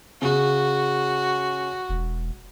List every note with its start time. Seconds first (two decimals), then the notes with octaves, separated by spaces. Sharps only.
0.22 C#3 F#4
1.89 E1